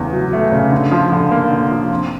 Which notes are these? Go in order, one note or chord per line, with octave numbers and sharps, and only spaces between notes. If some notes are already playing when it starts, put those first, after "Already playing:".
Already playing: E2 C#3 A3
F#3
A3
C#3
D3
F3
D3
A#3
D3
F3
C4